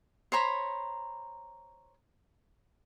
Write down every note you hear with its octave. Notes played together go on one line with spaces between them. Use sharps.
C5 C#5 A#5 B5